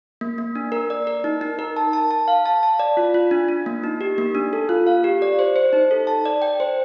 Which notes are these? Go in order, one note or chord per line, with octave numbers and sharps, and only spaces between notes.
A#3
A#3
D4
A#4
D5
A#4
D#4
D#4
A#4
A5
A5
A5
F5
A5
A5
D5
F4
F4
D4
D4
A#3
D#4
G4
A#3
D4
A4
F4
F5
G4
D5
C5
C5
D#4
A4
A5
D5
G5
C5